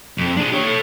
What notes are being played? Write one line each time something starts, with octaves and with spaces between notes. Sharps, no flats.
F2
D4 G#4
G4 C#5
A4 C#5